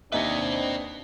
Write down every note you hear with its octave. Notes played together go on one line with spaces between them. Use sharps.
D#2 C4 D4 D#4 B4 D#5 E5